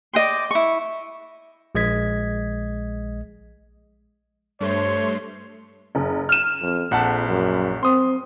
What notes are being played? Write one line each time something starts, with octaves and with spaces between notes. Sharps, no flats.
D5 D#5 G5 C6
E4 C#6
A#1 G#3 D#5 G#6 B6
G2 A3 C5 C#5 C6
F#1
F6 E7
F2
A#1 F2 F#5 A5
F#2
C4 C6 D#6